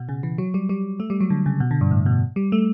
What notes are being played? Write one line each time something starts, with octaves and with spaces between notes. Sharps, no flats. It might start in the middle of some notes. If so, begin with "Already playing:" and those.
Already playing: B2
C#3
E3
F#3
G3
G3
A3
G3
F#3
D3
C#3
B2
D3
G2
A2
B2
G3
A3